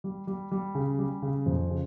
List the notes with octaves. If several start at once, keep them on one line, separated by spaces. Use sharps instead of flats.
G3
G3
G3
C#3
G3
C#3
F2
C#3